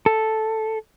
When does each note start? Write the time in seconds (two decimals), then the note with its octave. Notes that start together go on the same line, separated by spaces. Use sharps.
0.06 A4